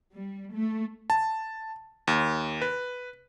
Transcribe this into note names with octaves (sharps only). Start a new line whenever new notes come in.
G3
A3
A5
D#2
B4